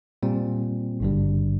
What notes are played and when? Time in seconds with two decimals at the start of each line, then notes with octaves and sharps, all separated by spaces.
0.23 A#2 G3 C4
1.00 G#1 G2 D3 G3